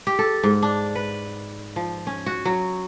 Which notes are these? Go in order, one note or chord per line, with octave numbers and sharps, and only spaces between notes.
G4
A4
G#2
D4
B4
F3
C#4
F#4
F#3